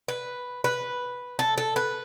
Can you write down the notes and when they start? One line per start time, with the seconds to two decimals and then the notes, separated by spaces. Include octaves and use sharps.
0.08 B4
0.64 B4
1.39 A4
1.58 A4
1.76 B4